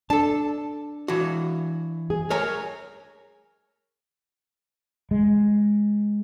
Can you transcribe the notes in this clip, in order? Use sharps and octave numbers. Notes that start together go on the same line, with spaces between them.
D4 A4 A5
E3 F#4
G#4
A#4 C#5 G#5
G#3